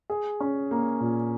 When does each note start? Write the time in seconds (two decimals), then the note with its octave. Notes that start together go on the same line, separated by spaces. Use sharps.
0.10 G#4
0.40 C#4
0.71 A#3
1.00 A#2